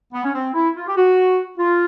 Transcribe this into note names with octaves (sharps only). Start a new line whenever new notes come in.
B3
C#4
C4
E4
F4
G4
F#4
F4